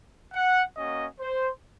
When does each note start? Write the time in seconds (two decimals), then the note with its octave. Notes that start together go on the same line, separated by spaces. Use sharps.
0.34 F#5
0.77 A#3 C#4 F#4 D#5
1.20 C5